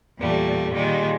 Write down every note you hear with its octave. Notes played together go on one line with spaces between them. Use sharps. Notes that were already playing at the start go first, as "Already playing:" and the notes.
E2 A#2 G3 A3
A#2 D#3 G3 G#3